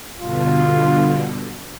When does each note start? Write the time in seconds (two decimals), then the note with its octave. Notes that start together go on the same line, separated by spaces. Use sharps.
0.19 G2 B2 D3 F4